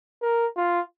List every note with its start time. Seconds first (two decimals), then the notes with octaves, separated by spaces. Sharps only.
0.22 A#4
0.57 F4